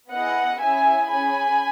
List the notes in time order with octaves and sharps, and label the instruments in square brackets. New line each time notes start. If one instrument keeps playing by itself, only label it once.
[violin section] B3 E4 G#4 D#5 F#5
C#4 E4 G#4 E5 G#5
C#4 G#4 G#5 B5